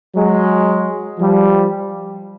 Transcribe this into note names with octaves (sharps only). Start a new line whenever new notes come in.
F#3 G#3
F3 G3